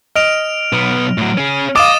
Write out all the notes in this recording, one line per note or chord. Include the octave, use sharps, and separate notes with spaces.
D#5 F6 D7 F7
B1 B3
A2 F#3
C#4 G#4
D#5 F5 D6 D#6 A6 E7